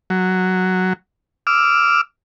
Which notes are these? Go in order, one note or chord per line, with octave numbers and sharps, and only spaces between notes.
F#3
D6 E6 F6